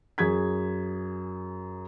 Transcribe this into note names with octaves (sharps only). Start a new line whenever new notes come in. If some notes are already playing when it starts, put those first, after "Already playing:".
F#2 G#4 G#6 B6